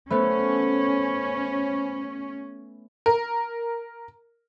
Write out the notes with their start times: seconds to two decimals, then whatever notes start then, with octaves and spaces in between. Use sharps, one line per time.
0.10 A3 B3 C#4 C5 B5
3.06 A#4